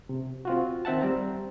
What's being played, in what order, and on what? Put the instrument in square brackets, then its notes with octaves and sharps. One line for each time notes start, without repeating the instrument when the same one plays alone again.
[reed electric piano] C3
C4 F4 F#4
D#3 C4 E5 F#5 A5
G3 C4 A#5